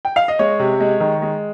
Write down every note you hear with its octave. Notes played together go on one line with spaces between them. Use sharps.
G5
F5
D#5
G#3 C#5
C3
G#3
D#3
G#3